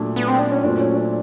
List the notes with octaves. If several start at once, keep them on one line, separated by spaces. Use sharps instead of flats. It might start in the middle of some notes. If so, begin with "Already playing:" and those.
Already playing: A#2 F#3 A3 D4
B3
C4
D4
C#4
A#2 F#3 A3 C4 D4
C#4
D4